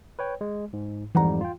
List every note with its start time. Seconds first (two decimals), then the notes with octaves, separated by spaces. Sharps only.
0.19 B4 C#5 G5
0.41 G#3
0.73 G#2
1.15 F2 G#2 E3 G3 F#5 A#5
1.41 F4 G5